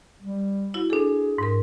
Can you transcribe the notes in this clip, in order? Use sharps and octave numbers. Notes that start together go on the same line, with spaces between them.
G3
E4 F#4
D4 G#4 A4
G#2 A#4